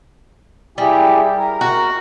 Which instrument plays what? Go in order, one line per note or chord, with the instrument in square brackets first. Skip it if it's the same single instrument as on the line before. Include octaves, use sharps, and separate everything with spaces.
[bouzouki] G3 [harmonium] E4 G4 G#4
[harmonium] A#4
[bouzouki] F#4